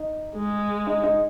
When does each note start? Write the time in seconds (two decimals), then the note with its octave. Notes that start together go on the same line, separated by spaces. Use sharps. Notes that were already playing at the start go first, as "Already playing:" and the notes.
Already playing: D#4
0.35 G#3
0.87 D#4
1.03 D#4